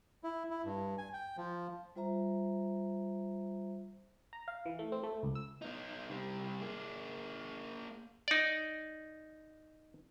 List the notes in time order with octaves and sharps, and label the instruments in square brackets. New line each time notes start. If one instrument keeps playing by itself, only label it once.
[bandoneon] E4
E4
G2
G#5
G5
F3
[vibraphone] G3 F4 C5 E5 A#5
[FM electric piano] A#5
F5
E3
A3
C4
A3
C#2
E6
[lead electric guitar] B3 D#4
C3 G3
A#3 G#4
[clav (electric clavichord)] D#4 D5